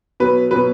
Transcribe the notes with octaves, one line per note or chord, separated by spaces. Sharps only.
B2 F#3 B4
B2 F#3 B4